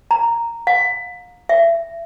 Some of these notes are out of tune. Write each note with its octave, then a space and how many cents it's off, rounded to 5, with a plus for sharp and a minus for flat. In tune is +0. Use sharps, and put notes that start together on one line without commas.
A#5 -5
F5 +40
E5 +25